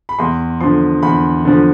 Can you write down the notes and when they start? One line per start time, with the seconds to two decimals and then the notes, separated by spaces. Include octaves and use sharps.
0.09 B5
0.19 E2 C6
0.61 D3 F3 C6
1.03 E2 B5
1.45 D3 F3